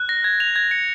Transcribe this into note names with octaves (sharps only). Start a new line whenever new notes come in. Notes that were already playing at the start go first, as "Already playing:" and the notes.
Already playing: F#6
A#6
G#6
F7
G#6
C#7